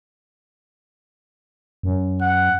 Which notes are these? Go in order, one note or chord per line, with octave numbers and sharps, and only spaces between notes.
F#2
F#5